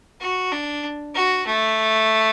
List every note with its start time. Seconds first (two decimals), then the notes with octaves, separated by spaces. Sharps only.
0.20 F#4
0.52 D4
1.15 F#4
1.46 A3